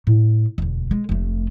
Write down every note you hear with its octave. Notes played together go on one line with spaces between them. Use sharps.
A2
E1 D2
G#3
F1 A3